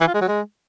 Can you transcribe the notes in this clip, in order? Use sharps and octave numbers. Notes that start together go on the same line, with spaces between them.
E3
F4
G#3
F#3
G#3